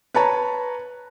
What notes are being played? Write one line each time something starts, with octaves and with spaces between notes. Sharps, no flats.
B4 C#5 A5 A#5